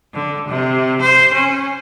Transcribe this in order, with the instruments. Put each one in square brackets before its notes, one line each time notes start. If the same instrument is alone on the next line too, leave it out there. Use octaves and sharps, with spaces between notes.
[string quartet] D3
C3
C5
C#4